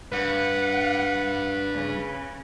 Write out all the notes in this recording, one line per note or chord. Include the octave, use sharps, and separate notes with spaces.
G2 B4 F#5
C#3